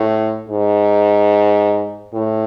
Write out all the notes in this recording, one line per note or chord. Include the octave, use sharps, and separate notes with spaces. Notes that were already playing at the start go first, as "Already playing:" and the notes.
Already playing: A2
G#2
A2